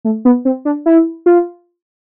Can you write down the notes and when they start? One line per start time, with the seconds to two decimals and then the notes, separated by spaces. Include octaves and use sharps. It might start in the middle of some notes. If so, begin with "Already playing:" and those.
0.05 A3
0.25 B3
0.45 C4
0.65 D4
0.86 E4
1.26 F4